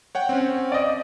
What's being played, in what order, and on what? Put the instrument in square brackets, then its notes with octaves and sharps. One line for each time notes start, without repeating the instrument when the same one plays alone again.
[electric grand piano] C#5 F#5 G5
C4 C#4
[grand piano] D5 D#5